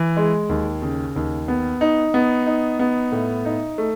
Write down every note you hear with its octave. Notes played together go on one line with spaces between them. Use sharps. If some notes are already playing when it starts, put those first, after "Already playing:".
Already playing: E3
G#3
D#2
C#3
D#2
B3
D#4
B3
D#4
B3
A2
D#4
A3